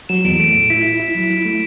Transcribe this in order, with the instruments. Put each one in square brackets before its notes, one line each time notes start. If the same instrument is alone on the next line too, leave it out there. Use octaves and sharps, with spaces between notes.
[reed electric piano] F#3 [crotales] E7
[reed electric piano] E2 [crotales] D7
[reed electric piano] A3 [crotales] D7
[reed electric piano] A2
[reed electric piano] E4 [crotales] B6
[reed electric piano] E4
E4
F#3
E4
A3